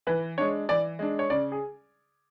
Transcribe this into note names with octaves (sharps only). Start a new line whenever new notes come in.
E3 B4
G#3 D4 C#5
E3 D5
G#3 D4
C#5
C#3 D5
G#4